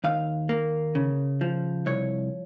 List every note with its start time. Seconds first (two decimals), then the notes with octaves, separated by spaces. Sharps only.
0.04 D#2 F5
0.49 A#3
0.95 C#3
1.41 F3
1.86 C2 C#5